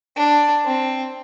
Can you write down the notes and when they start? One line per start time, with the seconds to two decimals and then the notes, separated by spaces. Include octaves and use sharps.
0.16 D4
0.65 C4